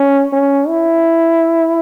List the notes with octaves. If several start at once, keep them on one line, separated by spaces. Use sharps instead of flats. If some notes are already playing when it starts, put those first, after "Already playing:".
Already playing: C#4
C#4
E4